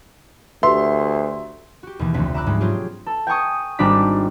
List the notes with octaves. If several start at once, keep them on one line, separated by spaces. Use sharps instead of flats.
D2 G4 B4 E5 C6
F#4 G4
D#2 B2 E3
F1 D2 A3 C4 F#5 B6
E5 A#5 B5 D6 E6 F#6
G#2 G3 G#3
F#3 A3 C4 F4 G4 G#4
A4
G5 G#5 C#6 D#6
G#1 G3 G#3 D4 D6 B6